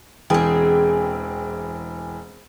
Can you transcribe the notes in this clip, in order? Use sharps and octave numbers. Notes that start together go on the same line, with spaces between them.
E1 E3 C4 G#4 G5